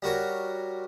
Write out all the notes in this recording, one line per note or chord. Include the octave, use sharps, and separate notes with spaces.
G3 F#4 A#4 C#5